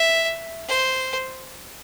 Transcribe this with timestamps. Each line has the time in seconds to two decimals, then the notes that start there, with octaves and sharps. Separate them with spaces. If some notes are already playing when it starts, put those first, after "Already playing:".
Already playing: E5
0.68 C5